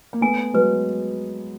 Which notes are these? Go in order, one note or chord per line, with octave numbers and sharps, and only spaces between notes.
A#3
A3 B3 G#5
F#3 G#3 B4